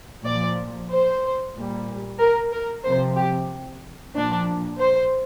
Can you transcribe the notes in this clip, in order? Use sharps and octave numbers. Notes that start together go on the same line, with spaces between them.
A#2 F3 D5
C5
A#2 G3
A#4
A#4
C3 F3 C5
G4
A#2 F3 D4
C5